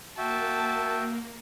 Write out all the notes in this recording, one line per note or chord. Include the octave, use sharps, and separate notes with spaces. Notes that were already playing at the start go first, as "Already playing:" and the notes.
A#3 F#4 E5 G5 A5